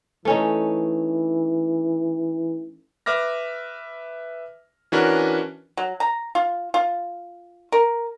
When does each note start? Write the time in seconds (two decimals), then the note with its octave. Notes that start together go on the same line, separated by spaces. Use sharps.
0.25 E3 A3 C#4 D#4
3.06 B4 E5 D6 F6 A#6
4.92 E3 C#4 D4 F#4 A#4 B4
5.77 F#3
6.00 A#5
6.35 F4
6.74 F4
7.72 A#4